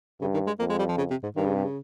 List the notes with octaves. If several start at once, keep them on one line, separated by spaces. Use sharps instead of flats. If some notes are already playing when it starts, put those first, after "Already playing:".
G2 C#3
D#3
G#3
F2 A#3
G#3
G3
F3
C#3
C3
G#2
G2 D#3
C#3
C3
C#3